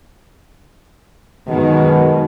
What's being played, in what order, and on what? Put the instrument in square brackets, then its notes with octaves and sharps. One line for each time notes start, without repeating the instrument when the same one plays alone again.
[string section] F#2 D#3 G#3 [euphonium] B2